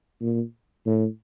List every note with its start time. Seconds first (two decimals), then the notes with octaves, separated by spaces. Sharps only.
0.21 A#2
0.86 A2